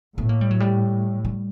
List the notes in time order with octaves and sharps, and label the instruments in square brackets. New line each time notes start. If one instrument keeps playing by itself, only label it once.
[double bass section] A2 [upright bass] B3
[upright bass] A#3
G3
F#3
G3
G3